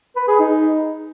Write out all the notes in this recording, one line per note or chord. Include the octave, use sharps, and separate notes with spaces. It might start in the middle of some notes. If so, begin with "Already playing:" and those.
B4
G#4
D#4